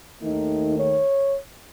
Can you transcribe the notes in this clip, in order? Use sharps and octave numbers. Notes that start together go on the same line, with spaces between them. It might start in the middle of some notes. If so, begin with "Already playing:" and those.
D#2 D#3 A3 D#4
C#5